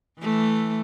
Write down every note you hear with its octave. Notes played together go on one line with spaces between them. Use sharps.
E3 A3